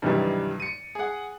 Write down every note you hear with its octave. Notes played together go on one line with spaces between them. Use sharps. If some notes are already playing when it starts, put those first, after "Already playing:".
G2 C3 D#3 E3 F#3 G3
C#7 D#7
G#4 F#5